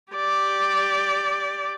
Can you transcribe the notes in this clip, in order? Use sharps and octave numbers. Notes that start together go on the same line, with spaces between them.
G4 D5